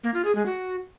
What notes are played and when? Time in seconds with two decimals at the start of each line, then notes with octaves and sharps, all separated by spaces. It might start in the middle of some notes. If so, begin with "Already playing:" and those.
0.04 A#3
0.14 F4
0.25 G#4
0.35 G#3
0.46 F#4